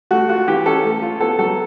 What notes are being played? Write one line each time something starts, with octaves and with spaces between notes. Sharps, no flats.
A3 F#4
F4 F#4
E3 G4
C#4 A4
A3
F4
B3 A4
F#3 A4